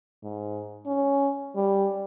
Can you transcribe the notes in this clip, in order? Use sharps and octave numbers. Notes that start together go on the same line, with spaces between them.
G#2
C#4
G3